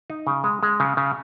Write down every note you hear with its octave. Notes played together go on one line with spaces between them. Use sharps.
D#4
C#3
G#3
G#3
C#3
C#3